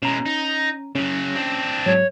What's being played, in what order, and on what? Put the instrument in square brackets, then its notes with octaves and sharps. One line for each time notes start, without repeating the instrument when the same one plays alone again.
[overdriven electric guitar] B2 G#3 [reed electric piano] C#4 A#5
[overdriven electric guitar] D#4
[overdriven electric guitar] C#3 F#3 [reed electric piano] C#4
[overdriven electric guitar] C4 D4
[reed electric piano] G#2 F#3 [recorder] C#5